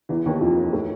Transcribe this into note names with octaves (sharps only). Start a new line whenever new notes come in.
E2 E3
D#2 D#3
F2 F3
A2 A3